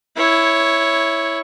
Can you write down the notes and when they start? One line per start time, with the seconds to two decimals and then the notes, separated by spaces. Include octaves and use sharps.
0.17 E4 C#5